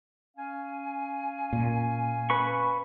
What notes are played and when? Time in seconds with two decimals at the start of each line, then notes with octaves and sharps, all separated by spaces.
0.37 C#4 F5 G#5
1.53 A#2
2.30 B4 B5 C#6